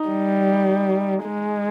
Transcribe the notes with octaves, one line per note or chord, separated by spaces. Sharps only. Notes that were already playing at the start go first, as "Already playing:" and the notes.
Already playing: D#4
G3
G#3